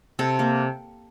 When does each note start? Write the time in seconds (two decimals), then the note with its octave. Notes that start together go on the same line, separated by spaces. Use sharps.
0.19 C3 A4
0.39 A#3